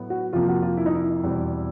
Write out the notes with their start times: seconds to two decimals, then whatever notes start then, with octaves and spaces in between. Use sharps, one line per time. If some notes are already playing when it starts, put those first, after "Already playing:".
Already playing: A2 F#3 B3
0.10 F#4
0.33 F2 C3 F3 A#3 F4
0.48 F#4
0.62 F4
0.77 E4
0.86 D#4
0.94 E4
1.23 E2 B2 G3 C4